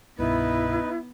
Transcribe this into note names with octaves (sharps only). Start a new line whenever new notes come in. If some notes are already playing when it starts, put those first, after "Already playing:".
C2 G2 B2 B3 D#4 E4 B4